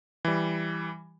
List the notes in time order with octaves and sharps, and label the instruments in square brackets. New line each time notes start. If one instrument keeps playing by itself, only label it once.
[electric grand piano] E3 G3